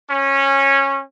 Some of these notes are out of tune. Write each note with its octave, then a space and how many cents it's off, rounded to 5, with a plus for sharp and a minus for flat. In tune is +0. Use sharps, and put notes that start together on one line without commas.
C#4 -15